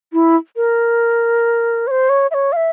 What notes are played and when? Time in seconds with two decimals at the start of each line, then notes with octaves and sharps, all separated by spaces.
0.13 E4
0.56 A#4
1.87 C#5
1.91 C5
2.09 C#5
2.31 E5
2.34 C#5
2.52 F5
2.56 E5